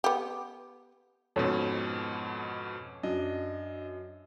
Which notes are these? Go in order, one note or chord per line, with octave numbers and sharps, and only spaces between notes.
B3 G4
F2 G#2 B2 C#4 A4
F#2 D4 D#5